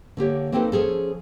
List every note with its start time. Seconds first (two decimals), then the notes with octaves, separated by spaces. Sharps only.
0.17 D3 A#3 G4 C#5
0.52 A#3 C4 D#4 G4 A4 B4
0.72 F3 C#4 G#4 A4